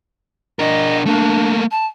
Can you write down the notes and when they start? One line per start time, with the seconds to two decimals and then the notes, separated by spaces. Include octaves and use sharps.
0.59 D4 A#4 D#5
1.06 A3 A#3 D4
1.71 A5